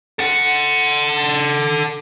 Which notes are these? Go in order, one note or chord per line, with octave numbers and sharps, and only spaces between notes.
A4 F#5